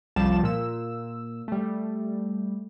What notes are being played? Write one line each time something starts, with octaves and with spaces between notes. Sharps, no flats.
C2 F3 G3 A5 E7
A#2 E6
G3 A3